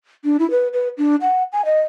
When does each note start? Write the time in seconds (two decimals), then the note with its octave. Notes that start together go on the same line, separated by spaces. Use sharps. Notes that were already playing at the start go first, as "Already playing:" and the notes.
0.24 D4
0.40 E4
0.51 B4
0.73 B4
0.98 D4
1.21 F#5
1.53 G#5
1.65 D#5